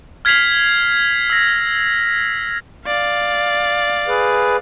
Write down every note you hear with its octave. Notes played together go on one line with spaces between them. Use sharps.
F6 G#6 B6 C7 F7 F#7
E6 A#6
D5 F5
G#4 B4